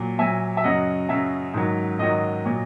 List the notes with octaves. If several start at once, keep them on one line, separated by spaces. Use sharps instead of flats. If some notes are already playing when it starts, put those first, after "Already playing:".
Already playing: A#2 F#3
A#2 F#3 E5 G#5
E5
F#2 C#3 F#3 D#5 F#5
F#2 C#3 F#3 E5
G#2 D#3 F#3
G#2 D#3 F#3 D#5
A#2 F#3